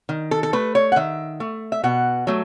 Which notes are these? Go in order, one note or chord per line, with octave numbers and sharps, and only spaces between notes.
D#3
A4
A4
A3 B4
C#5
F#5
D#3 E5
A3
E5
B2 F#5
F#3 A3